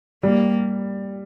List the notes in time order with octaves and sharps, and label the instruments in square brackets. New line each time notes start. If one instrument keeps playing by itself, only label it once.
[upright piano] G3 [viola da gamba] A#3